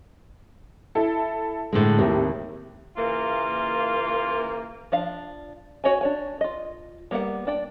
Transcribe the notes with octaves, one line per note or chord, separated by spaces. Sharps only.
E4 A4
A2 D3 G#3
D#2 A2 C3
C#3 E3 A#3 F4
F3 D4 F5
F#4 C#5 D#5 G#5
D4 C#5 G#5
F4 D#5
G3 A#3 B3 G#4 F#5
D4 D5 G5